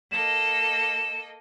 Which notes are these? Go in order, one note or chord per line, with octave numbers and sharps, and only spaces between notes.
A#3 A4 D#5 E7